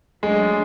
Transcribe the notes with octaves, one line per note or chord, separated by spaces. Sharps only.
F#3 G#3 A3 D4